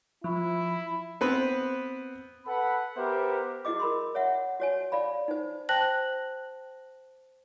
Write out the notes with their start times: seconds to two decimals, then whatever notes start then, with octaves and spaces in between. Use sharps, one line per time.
0.24 F3 E4
1.21 B3 C4 B4
2.46 A4 B4 F#5 B5
2.97 B3 G4 A#4 C5 E5
3.65 E4 F#4 G#4 D#5 D6
3.80 A#4 B5 C6
4.15 C#5 E5 F#5
4.60 F#4 C#5 G#5
4.92 D5 F5 B5
5.28 D#4 C5
5.69 C5 G5 A5 F#6 A#6 F#7